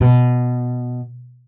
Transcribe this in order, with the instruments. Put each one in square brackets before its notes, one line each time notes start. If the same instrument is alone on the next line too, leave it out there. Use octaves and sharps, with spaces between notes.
[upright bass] B2